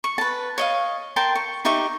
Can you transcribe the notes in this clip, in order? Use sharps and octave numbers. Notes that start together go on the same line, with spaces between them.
C#6
B4 A5
C#5 D#5 F5
A#4 G5 A5 C6
C#6
D#4 G4 E5 C#6